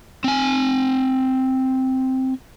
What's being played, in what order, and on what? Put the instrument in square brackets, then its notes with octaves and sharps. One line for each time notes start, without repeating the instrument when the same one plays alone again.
[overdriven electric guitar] C4 G#5